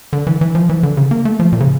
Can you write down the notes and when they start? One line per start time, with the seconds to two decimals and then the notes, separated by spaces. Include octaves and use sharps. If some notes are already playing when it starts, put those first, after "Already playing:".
0.13 D3
0.27 E3
0.41 E3
0.55 F3
0.69 E3
0.83 D3
0.97 C#3
1.11 A#3
1.25 A3
1.40 F3
1.53 A#2
1.60 C#3